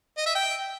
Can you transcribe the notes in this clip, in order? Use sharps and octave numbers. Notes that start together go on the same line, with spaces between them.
D#5
E5
G5